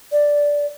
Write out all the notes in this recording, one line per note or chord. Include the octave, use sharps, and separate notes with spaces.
D5